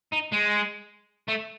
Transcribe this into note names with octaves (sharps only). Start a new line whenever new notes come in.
D#4
G#3
A3